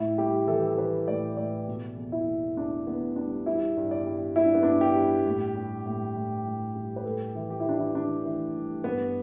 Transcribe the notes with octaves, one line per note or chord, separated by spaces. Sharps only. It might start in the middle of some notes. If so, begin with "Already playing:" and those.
Already playing: A2 E4
G3 G4
E3 A4
G4
A4
E3 B4
A2 D5
A2 D5
B2
E2
E4
E2
E2 D4
E2 B3
G3 D4
G3 E4
G2
D5
G3
G3 E4
D4
B3
G2 D4
G4
G3
A2
G3
A2
A2
A2
G3
B4
A2 A4
E3
G4
E4
E3 D4
E4
E3 D4
E3
G3
G2 B3